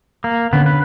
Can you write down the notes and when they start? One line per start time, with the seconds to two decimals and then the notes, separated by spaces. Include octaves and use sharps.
0.24 A#3
0.53 D3 B3 C#4
0.66 B4